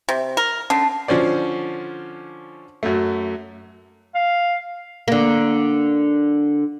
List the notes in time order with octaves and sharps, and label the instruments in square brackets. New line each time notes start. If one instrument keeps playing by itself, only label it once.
[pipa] C3
A#4
[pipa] D3 [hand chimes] C#4 A5 C7
[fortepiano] D3 F3 C#4 C5 D5
F#2 F#3 A3
[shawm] F5
[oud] D3 A#3